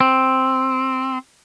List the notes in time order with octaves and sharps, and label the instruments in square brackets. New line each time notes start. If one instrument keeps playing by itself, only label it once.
[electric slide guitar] C4